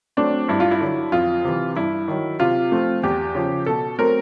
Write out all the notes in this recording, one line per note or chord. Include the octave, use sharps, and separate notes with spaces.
F#3 A3 C4 D4
G2 E4
F4
E4
D3 F#3
F2 F4
C3 E3
G2 E4
D#3 F#3
C3 F4
F3 A3 C4
E2 G4
C#3 F3
B2 A4
F#3 A3 C4 A#4